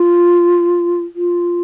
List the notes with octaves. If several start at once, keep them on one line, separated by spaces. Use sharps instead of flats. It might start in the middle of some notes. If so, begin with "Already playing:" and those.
Already playing: F4
F4